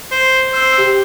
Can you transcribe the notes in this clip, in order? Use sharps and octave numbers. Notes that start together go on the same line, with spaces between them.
C5
C5 E6
G4